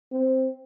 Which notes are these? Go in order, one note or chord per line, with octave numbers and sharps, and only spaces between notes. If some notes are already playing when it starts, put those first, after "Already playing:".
C4